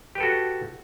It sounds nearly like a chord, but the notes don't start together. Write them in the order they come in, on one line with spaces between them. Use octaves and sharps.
G4 B4 A4 F#4